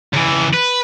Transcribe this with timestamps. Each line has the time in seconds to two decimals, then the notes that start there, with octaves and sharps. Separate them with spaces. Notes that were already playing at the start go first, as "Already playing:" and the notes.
0.14 C#2 E3
0.54 B4